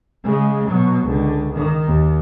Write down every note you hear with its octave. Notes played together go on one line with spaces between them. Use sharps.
C#3 G#3
B2 F#3
C#2 D3
D#3
D#2